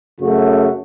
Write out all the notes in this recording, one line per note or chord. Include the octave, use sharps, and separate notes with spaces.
F#2 C#3 A3 F#4